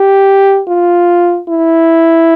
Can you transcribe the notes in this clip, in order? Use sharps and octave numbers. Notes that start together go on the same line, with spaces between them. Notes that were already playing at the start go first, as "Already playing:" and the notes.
Already playing: G4
F4
E4